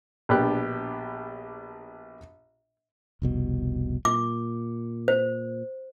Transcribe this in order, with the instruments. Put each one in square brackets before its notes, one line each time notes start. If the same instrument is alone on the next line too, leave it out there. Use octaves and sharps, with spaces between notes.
[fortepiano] A#1 B2 D4 G4 F#6
[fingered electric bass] F1 C2 B2
[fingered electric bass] A#2 [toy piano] D6
[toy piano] C5